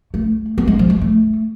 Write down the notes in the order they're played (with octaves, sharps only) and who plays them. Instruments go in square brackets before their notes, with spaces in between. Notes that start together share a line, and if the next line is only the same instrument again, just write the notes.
[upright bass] A3
B3
G#3
F3
G#3
A3